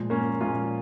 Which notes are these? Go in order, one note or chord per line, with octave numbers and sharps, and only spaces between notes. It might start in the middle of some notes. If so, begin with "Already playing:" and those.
Already playing: A#2 F3 G#3
A#3 C#4
A#2 F3 G#3 C#4 F4